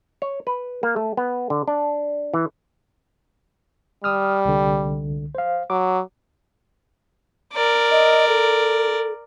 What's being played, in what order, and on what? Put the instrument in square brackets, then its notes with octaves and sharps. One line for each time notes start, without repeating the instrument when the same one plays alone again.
[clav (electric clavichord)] C#5
B4
A#3
A3
B3
D3
D4
E3
[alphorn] G3 [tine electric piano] D#6 F6
[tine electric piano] C2 D3
C5 F5
[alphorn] F#3 [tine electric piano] D6
[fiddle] A#4 D5
[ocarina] D#5
A4